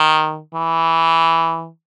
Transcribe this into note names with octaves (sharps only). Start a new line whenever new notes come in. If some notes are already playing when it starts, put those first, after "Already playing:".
Already playing: D#3
E3